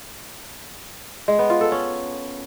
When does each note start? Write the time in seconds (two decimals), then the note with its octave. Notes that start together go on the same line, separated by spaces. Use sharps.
1.28 G#3
1.39 B3
1.50 F4
1.61 A4
1.72 C#4